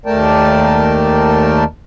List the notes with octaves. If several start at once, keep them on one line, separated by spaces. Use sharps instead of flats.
D#2 A3 A#4 D5 G5 A5